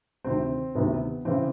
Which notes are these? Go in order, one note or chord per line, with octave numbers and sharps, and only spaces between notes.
D2 C3 D#3 C4
D2 C3 D#3 B3
C#3 E3 C4